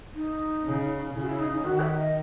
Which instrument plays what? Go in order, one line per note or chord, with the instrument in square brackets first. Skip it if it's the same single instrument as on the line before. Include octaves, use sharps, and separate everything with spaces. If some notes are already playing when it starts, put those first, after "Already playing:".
[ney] D#4
[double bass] C#3
[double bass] C#3 [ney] E4
[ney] F#4
E4
D#4
D#4
[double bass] D#3 [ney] F#4
[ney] E5
D#5